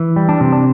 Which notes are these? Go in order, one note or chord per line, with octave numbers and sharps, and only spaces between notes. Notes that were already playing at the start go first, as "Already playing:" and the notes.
Already playing: E3
G3
D4
C3
D4